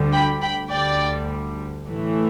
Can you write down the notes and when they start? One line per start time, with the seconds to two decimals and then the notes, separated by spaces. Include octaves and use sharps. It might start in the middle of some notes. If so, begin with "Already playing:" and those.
Already playing: D2 D3 G3
0.13 G5 B5
0.42 G5 B5
0.71 D2 D3 G3 D5 G5
1.88 A2 E3 A3